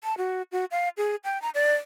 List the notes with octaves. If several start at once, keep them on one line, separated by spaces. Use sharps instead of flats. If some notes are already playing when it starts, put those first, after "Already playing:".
A5
F#4
F#4
F5
G#4
G5
A#5
D5